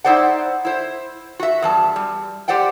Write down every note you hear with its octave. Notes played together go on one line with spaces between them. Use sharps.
D#4 E4 C5 D5 F#5
E4 C5
F#4 E5
E2 G2 A5
G3
G4 C5 D5 F#5 G5